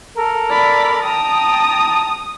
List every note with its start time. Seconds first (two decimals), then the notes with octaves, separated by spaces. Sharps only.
0.16 A4 A#4
0.50 D5 B5
1.03 G5 A5 A#5 D#6